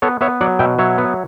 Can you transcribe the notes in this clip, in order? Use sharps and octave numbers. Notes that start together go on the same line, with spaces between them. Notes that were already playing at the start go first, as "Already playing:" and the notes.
B3 A4 C#5
B3 C#5 E5
F#3 D5 F#5
B2 E5 G5
F#3 C#5 E5
B3